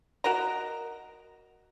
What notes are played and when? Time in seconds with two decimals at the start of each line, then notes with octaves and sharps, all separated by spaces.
0.24 F#4 A#4 D#5 A#5